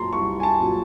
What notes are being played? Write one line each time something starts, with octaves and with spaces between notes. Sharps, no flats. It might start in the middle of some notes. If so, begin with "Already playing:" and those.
Already playing: A#2 F#3 A5 A#5 C6
C2 C#6
G#5
A5
A#2 F#3